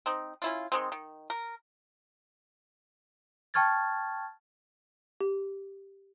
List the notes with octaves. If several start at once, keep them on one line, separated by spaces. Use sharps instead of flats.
C4 D#4
C#4 E4 F4
D#3 G#3 C4
D#3
A#4
G5 A5 C#6 F6 G#6 A6
G4